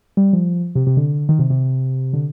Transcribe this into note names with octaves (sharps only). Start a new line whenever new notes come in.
G3
F3
C3
C3
D3
D#3
C3
C3
D3